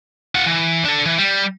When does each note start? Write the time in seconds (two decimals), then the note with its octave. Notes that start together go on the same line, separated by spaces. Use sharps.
0.35 F4 F#5
0.46 E3
0.85 D4 A4
1.06 E3
1.18 G3